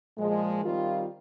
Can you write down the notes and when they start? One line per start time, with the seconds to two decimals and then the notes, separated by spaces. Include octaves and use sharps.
0.17 A#2 F3 G#3
0.62 D#3 G3 C4 F4